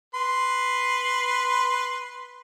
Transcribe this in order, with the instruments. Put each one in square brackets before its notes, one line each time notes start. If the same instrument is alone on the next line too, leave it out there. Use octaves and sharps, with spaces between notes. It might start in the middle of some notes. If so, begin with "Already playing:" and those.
[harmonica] B4 C6